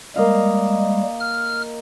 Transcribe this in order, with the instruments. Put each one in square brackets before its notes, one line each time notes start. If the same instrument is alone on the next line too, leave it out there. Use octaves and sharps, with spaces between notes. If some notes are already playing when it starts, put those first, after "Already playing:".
[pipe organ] G3 G#3 [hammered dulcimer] A#3 D#5 F5
[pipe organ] F6